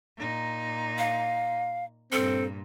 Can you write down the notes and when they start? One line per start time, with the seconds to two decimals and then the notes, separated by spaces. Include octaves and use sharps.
0.17 A#2 D#4
0.98 F5
2.12 G2 A#2 C4 A4